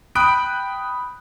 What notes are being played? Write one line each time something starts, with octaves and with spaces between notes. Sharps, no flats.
G5 B5 D#6 F#6 D7